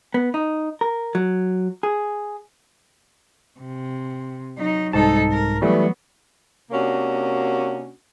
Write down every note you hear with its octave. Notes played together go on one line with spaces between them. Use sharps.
B3
D#4
A#4
F#3
G#4
C3
F#3 D#4
C2 G#2 D#4 A4 A5
A#4
E3 F#3 G3 A3 B3
C3 A#3 C#4 D4 F#4